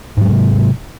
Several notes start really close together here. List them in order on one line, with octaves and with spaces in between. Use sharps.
G#2 F#3 G#3 C3